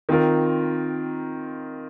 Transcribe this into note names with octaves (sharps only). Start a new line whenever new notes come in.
D#3 C4 F4 A#4